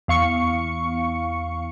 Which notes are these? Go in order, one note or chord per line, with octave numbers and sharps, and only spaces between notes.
E2 F5 C#6 C#7